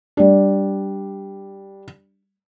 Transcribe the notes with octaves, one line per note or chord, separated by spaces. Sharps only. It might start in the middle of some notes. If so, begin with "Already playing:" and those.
G3 D4